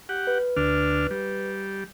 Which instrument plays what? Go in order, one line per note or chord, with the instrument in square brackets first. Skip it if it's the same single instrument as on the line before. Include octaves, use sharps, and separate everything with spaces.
[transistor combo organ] G4 F#5
[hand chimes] B4
[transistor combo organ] D2 D4 F6
G3